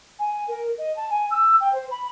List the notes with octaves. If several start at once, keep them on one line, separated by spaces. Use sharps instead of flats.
G#5
A#4
D#5
A5
G#5
E6
G5
C5
B5